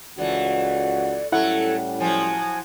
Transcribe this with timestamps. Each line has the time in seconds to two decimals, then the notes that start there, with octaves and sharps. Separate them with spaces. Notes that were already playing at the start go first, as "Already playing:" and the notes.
0.18 C#2 E3 A3 F#4 D5
1.32 A2 F#3 G3 A3 C#4 E4 A4 F#5
2.00 F3 F#3 G#5